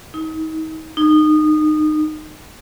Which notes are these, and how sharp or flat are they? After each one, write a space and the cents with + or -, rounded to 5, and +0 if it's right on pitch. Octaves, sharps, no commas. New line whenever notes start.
D#4 +35
D#4 -25